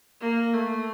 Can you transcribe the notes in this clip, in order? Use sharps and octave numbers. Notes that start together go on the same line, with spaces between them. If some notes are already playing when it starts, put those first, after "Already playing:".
A#3
A3